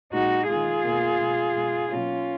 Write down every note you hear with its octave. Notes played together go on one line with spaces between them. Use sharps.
A#2 G#3 D#4 F#4
D#3 G#3 F4 G#4
B2 A#3
B2 G#3
B2 G#3
B2 F#3 A#3 C#4 F4